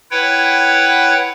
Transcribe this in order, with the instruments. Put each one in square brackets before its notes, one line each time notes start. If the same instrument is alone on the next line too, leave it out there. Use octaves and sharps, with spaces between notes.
[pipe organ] E4 B4 C#5 F#5 G5